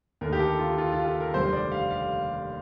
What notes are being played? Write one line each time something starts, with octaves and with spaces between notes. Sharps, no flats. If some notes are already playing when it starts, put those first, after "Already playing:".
D#2 D3 A3 A#4
G4
A4
F4
F4
F4
A4
A#4
F1 D#2 D3 G3 C5
D5
F5
F5